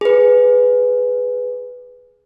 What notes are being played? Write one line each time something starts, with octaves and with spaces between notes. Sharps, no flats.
G#4 B4